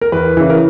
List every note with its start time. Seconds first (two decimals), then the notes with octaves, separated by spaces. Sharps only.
0.01 A#4
0.12 E2 B4
0.37 C#3 E3
0.50 A#4